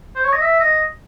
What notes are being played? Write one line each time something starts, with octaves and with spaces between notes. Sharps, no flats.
C5
C#5
D#5
E5
D#5